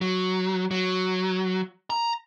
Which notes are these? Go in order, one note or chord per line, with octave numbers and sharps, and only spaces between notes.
F#3
F#3
A#5